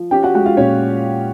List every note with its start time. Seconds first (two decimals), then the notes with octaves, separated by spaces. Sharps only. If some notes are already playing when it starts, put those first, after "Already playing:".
Already playing: F3
0.11 C#4 G4 G5
0.23 F#4 F#5
0.35 G#3 F#4 F#5
0.46 F4 F5
0.57 A#2 C#4 C#5